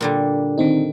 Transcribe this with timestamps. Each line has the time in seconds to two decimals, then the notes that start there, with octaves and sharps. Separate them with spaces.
0.01 A#2 D3 G3
0.58 D#3 C4 D#4